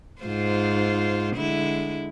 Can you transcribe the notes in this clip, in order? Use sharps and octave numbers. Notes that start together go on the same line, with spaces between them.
G#2 F4 C5
D3 G#3 E4